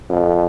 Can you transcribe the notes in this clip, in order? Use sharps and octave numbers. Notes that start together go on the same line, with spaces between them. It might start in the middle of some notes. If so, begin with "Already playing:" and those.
F2